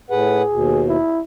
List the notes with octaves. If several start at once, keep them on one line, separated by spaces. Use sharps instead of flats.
A2 G#4 B4 F#5
D#2 B2
E4